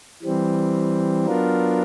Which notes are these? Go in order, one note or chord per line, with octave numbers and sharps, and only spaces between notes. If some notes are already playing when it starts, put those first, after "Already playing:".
E3 G3 C4
F#3 B3 D4 F4 A#4